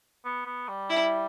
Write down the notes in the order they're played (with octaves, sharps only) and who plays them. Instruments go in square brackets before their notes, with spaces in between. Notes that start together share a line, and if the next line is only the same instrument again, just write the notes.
[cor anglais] B3
B3
G3
[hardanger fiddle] E4